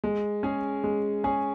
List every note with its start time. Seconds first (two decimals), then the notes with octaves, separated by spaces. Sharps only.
0.04 G#3
0.43 C#4 G#4
0.84 G#3
1.24 C#4 G#4